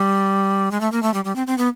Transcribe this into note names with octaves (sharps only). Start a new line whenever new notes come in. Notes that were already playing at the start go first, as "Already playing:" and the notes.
Already playing: G3
G#3
A3
A#3
A3
G3
G3
C4
C4
B3